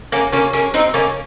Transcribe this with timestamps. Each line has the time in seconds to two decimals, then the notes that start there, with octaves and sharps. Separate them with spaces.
0.12 A#3 C#4
0.32 A#3 C#4
0.53 A#3 C#4
0.74 C4 D#4
0.94 A#3 C#4